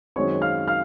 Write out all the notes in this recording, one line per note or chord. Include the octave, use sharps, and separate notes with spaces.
F#2 D#3 G#3 C4 F#4 C#5 C#6
F5 F6
F5 F6